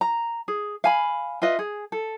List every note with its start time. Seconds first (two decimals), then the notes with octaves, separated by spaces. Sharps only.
0.01 A#5
0.48 G#4
0.84 F5 G#5 B5
1.42 F4 B4 D#5 E5
1.59 G#4
1.92 A4